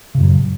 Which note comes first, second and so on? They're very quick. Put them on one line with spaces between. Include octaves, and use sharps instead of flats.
C#3 A2 F#2 F#3